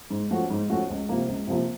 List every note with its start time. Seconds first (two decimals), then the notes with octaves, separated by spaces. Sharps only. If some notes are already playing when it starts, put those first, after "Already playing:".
0.10 G#2
0.31 F3 A3 C#4 F#4
0.50 G#2
0.69 F3 A3 C#4 F#4
0.90 C#2
1.09 C3 F3 A#3
1.28 C#2
1.47 C3 F3 A#3